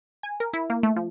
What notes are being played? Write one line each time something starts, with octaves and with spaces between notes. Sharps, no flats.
G#5
A#4
E4
A#3
A3
F3